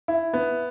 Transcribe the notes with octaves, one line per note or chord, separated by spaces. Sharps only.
E4
B3